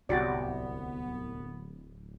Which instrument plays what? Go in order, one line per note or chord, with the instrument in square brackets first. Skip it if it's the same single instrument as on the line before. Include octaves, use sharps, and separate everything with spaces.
[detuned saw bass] D1 [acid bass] C2 [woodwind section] B3 [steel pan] F#4 G4 D5